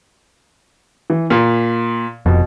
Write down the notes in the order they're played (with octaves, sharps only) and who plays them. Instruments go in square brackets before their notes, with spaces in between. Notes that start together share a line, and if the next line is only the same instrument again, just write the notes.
[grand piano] E3
A#2
[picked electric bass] F1 F2 [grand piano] B2